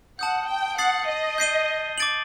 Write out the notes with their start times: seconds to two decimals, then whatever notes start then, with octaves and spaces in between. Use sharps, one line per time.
0.19 F#5 A5 D#6 G6
0.48 G5
0.78 F#5 D#6 A6 C7 F#7
1.08 D#5
1.38 G6 C7 D#7 G7
1.98 D6 A6 D7 F#7